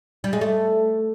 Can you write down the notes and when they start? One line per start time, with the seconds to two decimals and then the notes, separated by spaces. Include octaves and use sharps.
0.24 G3
0.33 G#3
0.41 A3